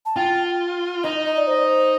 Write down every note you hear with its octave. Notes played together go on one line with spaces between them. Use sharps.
A5
F4 G5
D#4 D#5
D#5
D5
C5